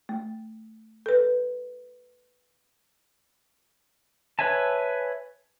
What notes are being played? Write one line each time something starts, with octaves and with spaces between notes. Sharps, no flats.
A3
A4 B4
B4 C#5 E5 G#5 A5